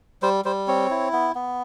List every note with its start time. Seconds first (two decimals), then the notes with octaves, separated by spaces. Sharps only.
0.22 G3 C5
0.45 G3 C5
0.67 C4 C#5
0.90 E4
1.13 B3
1.35 B3